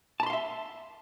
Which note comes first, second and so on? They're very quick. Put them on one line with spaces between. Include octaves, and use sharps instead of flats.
A5 B5 C6 F5 E5